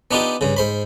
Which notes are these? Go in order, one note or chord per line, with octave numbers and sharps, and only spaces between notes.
B3 D4 D#4 F4 G4
G2 C#3
G#2 C5 B5